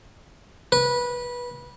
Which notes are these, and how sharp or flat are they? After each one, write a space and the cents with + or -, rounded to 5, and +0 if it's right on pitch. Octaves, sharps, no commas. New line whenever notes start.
B4 -20